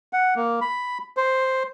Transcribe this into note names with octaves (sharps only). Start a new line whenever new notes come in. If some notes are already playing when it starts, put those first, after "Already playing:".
F#5
A#3
B5
C5